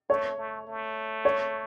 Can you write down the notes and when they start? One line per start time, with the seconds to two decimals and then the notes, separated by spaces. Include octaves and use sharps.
0.10 A3 C#5
0.38 A3
0.67 A3
1.25 C#5